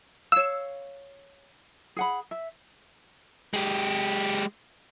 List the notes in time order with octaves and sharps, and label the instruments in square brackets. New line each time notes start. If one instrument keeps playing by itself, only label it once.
[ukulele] C#5 F5 [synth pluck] E6
[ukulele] G#4 F#5 B5
E5
[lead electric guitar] G#3 G4